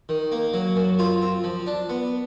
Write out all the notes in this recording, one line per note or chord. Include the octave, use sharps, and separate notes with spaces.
D#3
A#3
F#3
F#2
F4
C4
F3
D4
B3